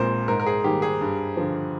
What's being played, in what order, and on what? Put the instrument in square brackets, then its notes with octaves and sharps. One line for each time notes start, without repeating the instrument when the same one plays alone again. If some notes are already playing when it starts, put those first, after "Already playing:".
Already playing: [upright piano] A#1 A#2 G#3 C4 F4 [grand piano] A#4 C5
[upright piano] G#2 [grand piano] A#4
[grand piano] A#4
G#4
[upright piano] D#3 G3 A#3 [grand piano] G4
[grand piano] G#4
[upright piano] G2
D3 F3